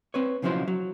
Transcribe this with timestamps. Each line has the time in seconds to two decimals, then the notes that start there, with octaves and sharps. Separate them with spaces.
0.14 C4 B4 C#5
0.42 B1 C#3 F3 F#3 E4 C5
0.68 F#3